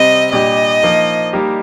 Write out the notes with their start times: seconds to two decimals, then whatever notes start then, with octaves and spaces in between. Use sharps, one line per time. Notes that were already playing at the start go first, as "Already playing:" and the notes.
Already playing: C3 G3 C4 D#5
0.32 A#2 G3 D4 G4 D#5
0.82 F3 A#3 D#4
1.33 G3 A#3 D#4 G4